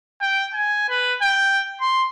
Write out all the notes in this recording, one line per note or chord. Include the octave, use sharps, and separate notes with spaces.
G5
G#5
B4
G5
C6